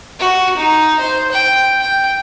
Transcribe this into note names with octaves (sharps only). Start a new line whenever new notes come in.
F#4
D#4
C5
G5
G5